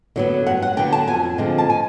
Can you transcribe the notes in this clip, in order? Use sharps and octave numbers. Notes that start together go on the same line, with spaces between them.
D3 F#3 B3
G2 F#5
F#5
D3 F#3 B3 G5
A5
F2 G#5
D3 F3 G#3 C4
A5
G#5